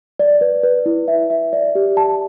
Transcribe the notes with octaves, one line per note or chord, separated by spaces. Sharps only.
D5
B4
B4
E4
E5
E5
D5
G4
A5